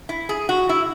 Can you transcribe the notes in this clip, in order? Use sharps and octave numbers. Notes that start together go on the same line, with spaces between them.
E4
G#4
F#4
E4